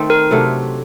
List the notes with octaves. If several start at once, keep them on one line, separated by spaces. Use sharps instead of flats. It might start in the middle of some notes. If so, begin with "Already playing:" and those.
Already playing: D#3 A3 C4
A#4
C3 F#3 A3 D4